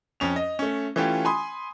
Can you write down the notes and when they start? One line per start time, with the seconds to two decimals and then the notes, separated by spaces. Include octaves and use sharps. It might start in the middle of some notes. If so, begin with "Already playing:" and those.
0.20 F2 C#4 F7
0.36 D#5
0.59 A3 C#4
0.96 E3 A3 C#4 F4 G4
1.25 G#5 B5 C6 D#6